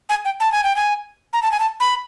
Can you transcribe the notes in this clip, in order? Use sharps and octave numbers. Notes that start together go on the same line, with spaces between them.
G#5
G5
A5
G#5
G5
G#5
A#5
A5
G#5
A5
B5